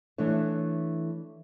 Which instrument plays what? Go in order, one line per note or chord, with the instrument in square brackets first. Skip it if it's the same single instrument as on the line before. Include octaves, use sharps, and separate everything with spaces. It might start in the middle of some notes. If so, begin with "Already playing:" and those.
[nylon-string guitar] E3 A3 D4 C#5